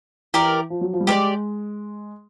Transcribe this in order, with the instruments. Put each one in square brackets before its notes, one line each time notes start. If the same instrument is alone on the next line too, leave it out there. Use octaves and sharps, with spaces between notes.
[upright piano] E3 [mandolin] G4 A#4 D5
[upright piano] F3
F#3
F3
G3
[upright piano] G#3 [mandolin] G4 A#4 D5